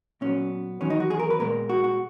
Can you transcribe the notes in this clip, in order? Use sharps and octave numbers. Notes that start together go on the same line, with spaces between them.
A#2 F#3 B3 C#4
E2 D#3 F#3 B3 C#4
D#4
F#4
G#4
A#4
B4
A#2 G#3 B3 A#4
F#4
F#4